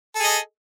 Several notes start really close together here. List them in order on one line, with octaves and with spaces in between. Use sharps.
A4 G#4 D#5